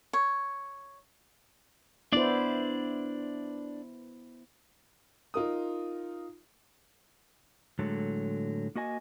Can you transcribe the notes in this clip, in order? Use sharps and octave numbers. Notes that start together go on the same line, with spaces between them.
C#5
B3 D4 E4 C5 D5
D#4 F4 A#4 D#6
A2 D3 F#3 G#3 A4
A#3 F#4 D#5 G#5